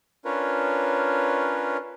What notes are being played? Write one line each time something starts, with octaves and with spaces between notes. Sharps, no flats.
C#4 D4 F4 A#4 B4 C#5